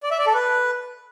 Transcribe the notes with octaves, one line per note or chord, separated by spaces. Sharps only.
D5
E5
D5
A4
B4